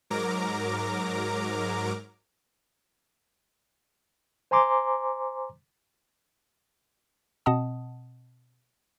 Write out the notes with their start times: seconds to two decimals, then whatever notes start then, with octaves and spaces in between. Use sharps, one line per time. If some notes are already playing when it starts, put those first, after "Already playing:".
0.10 G#2 F#3 A#4 A#5 D6
4.51 C5 G#5 A#5 C6 D6
7.46 B2 C4 D#5 F#5 A5 D#6